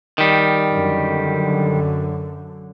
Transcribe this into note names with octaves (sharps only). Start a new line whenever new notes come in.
D#3 G3
F#2 D3